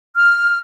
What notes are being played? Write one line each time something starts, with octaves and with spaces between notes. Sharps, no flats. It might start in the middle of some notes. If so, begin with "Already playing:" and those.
F6